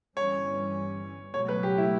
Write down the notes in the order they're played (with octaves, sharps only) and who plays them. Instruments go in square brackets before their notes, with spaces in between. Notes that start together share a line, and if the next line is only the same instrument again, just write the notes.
[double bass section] G1 G2 E3 G3 C#4 [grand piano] C#5
[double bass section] C#2 B2 F#3 A3 [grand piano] C#5
[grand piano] B4
G4
E4